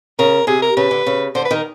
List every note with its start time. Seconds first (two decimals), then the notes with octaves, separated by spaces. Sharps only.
0.19 C#3 A#4
0.47 C3 G#4
0.62 A#4
0.77 C#3 B4
0.91 D3
1.07 C#3
1.35 D3 C5
1.45 B4
1.51 D#3 A#4